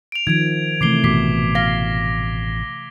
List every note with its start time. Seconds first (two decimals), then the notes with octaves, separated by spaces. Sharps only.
0.12 D7 F7
0.27 D#3 F3 G#6 D7
0.81 C3 E3 A3 D6 C7 G7
1.04 A1 B2 D6 B6 C7
1.55 F5 A#6 B6 G7